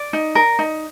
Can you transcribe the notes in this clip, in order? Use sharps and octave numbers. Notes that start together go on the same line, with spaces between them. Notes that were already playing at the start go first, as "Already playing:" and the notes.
Already playing: D5
D#4
A#4
D#4